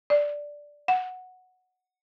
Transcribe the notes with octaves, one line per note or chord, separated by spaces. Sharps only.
D5
F#5